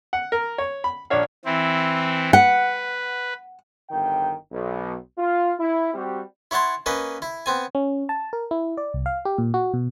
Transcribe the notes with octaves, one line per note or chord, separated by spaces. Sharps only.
F#5
A#4
C#5
B5
A#1 D4 C#5 F5
E3 C4 E4
B4 F#5
G1 D#3 G5
B1
F4
E4
G3 C4 F#4 G4
E4 C#5 F#5 A5 C6
A#3 C#4 B4 D#5
E4
B3 C4 G#5
C#4
A5
A#4
E4
D5
C2
F5
G4
A#2
F#4
B2